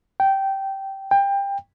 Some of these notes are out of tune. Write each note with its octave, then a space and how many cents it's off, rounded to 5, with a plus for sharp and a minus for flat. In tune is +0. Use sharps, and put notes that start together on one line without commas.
G5 -15
G5 +20